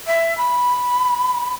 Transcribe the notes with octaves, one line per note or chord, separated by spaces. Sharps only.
E5
B5